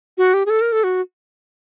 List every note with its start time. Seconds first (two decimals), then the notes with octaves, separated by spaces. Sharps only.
0.18 F#4
0.34 G4
0.46 G#4
0.50 A4
0.61 A#4
0.72 A4
0.84 F#4